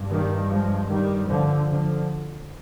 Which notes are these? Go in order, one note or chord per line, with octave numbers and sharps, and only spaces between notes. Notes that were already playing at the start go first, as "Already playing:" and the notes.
Already playing: G2
D#3 G3
F3 G#3
D#3 G3
D3 F3
D3 F3